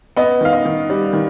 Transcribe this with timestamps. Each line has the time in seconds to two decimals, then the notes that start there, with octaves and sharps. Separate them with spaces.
0.16 B3 D#5
0.41 D#3 F5
0.53 D#5
0.65 D#3
0.90 G3
1.13 D#3